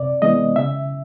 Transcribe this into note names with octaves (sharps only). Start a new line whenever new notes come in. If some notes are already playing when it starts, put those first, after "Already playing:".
Already playing: C3 D5
E3 G#3 B3 D#5
C#3 E5